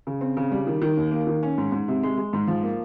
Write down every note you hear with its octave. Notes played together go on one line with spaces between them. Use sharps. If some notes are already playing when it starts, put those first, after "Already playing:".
C#3
C4
C#3
G3
D#3
D#3
D#2
A#3
D#3
C#4
G#2
G#2
C3
G#3
G#3
G#2
F3
A#3